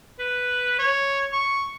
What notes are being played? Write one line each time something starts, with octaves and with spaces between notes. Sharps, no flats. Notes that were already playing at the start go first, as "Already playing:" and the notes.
B4
C#5
C#6